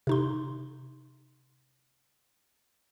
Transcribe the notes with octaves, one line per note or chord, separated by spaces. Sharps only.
C3 D#4 C6